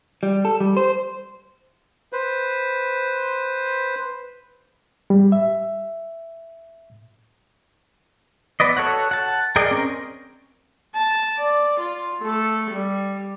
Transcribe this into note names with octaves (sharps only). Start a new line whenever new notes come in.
G3
A4
G3
C5
B4 C5
G3
E5
B3 B4 D5 D#5
F#4 A4 C#5 F#5
F#5 A5
G#4 A#4 D5 D#5 G5
C4 C#4 A#4
A5
D5
F4
A3 A4
G3